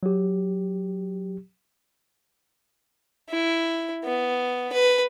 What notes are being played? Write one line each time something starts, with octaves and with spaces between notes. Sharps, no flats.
F#3 G4
E4
B3
B4